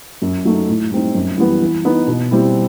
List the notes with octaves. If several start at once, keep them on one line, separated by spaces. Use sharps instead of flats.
F#2
F#3 A3 D#4
A2
G3 C4 D#4
F#2
E3 G3 B3
E3
B3 D#4
B2
G3 C4 E4